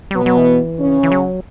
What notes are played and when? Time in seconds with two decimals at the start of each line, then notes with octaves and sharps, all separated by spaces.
0.11 G3
0.15 B2 F#3 B3
0.26 F#3
0.37 E3
0.80 C#3 C#4
1.03 E3
1.12 F#3